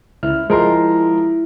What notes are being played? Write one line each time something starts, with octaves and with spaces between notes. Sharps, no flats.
C#2 E4 F6
F3 G#3 A#4 C6